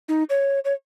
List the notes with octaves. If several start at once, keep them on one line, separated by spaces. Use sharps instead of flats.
D#4
C#5
C#5